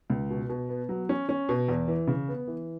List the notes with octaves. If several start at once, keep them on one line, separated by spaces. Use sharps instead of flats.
C#2
B2
B2
B3
F#3
C#4
C#4
B2
E2
E3
C#3
B3
E3